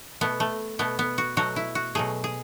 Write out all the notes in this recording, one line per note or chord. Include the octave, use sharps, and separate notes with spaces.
B2 A3 B3
A3
B2 A3 B3
B3
F#4
B2 F#3 A3 F#4
E4
F#4
B2 F#3 A3 G#4
G#4